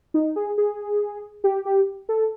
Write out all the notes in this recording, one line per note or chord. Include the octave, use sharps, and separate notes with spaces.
D#4
G#4
G#4
G4
G4
A4